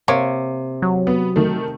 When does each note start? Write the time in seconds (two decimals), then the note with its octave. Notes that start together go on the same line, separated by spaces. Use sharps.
0.08 C3 A#3 C#5
0.82 F#3
1.07 B3
1.36 D#3 A3